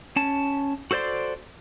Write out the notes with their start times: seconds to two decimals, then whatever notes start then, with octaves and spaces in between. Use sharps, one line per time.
0.16 C#4 A5
0.91 F#4 A4 C5 D5 C6